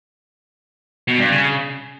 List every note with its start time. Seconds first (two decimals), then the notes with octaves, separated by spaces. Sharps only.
1.08 B2
1.19 G2
1.30 C#3